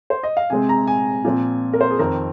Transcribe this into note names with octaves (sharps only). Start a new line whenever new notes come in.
C5
D#5
F5
C3 G#3 C4 G#5
A#5
G#5
A#2 F3 C4
A#4
C5
G#4
F2 D#3 C4 A#4